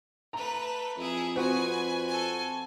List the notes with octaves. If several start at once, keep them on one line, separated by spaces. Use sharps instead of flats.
A3 B4 A#5
F2 E4 G#4
C4 F#4 B4 G#5
A4 G#5